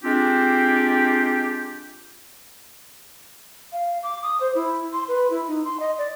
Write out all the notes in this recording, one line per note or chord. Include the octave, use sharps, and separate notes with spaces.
G#3 C4 D4 F4 G4
F5
D6
D#6
C5
E4
C6
B4
E4
D#4
C6
D#5
D5